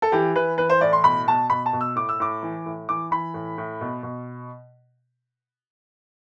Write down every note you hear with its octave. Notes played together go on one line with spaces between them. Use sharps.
A4
E3 G4
E3 B4
E3 B4
C5
A2 D5
C6
B2 B5
B2 A5
B2 B5
A5
B2
E6
A2 D6
E6
A2 D6
E3
A2
E3 D6
E3 B5
A2
A2
B2
B2